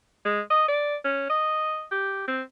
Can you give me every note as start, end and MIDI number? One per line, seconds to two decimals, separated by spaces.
0.25 0.40 56
0.50 0.66 75
0.68 0.95 74
1.05 1.27 61
1.29 1.84 75
1.91 2.25 67
2.28 2.42 60